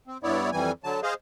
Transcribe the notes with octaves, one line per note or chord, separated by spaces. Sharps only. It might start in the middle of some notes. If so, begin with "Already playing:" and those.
C4
G2 B3 E4 C#5 D5
F2 E3 G3 G#5
D3 F#3 A5
G#4 C5 D#5 F5